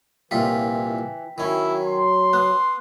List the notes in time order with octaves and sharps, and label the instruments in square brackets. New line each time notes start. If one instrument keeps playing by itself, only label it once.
[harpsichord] C2 A#2 F4 [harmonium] E3 [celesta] G5 B6
[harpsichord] D#3 C#4 [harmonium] F#3 [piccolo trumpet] E4
[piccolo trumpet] C6
[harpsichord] B3 [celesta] F#6